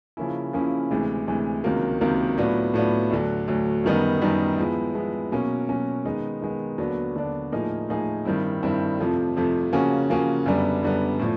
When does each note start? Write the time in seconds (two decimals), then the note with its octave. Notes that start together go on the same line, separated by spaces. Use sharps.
0.17 C#3 F3 A#3 C#4 E4
0.53 C#3 F3 A#3 C#4 E4
0.91 D2 C3 E3 G#3
1.27 D2 C3 E3 G#3
1.64 C#2 C3 D#3 F#3 A#3
2.00 C#2 C3 D#3 F#3 A#3
2.37 A2 F#3 B3 D4 F4
2.74 A2 F#3 B3 D4 F4
3.10 D2 D3 F#3
3.48 D2 D3 F#3
3.84 F#2 D#3 G3 B3 D#4
4.22 F#2 D#3 G3 B3 D#4
4.58 F3 G#3 B3 E4
4.94 F3 G#3 B3 E4
5.32 B2 F#3 A#3 C#4
5.69 B2 F#3 A#3 C#4
6.05 D#3 G#3 B3 D#4
6.41 D#3 G#3 B3 D#4
6.78 D#2 D3 F#3 B3 D4
7.15 D#2 D3 F#3 B3 D4
7.52 A2 F3 A#3 D#4 G#4
7.89 A2 F3 A#3 D#4 G#4
8.25 G2 D#3 G3 C4 E4
8.63 G2 D#3 G3 C4 E4
8.99 F2 C3 F3 A3
9.36 F2 C3 F3 A3
9.73 C#3 F3 A#3 C#4 F#4
10.09 C#3 F3 A#3 C#4 F#4
10.46 F#2 D3 G3 B3 D4
10.83 F#2 D3 G3 B3 D4
11.19 A2 F3